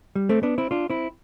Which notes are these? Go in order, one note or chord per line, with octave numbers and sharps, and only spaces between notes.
G3
A3 C4
B3 D4
C4 E4
D4 F4
C4 E4